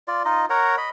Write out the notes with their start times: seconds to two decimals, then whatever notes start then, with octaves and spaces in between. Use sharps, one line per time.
0.08 F4 D5
0.25 D#4 F4 D#5
0.50 A#4 C#5 F#5 A#5
0.77 D#5 B5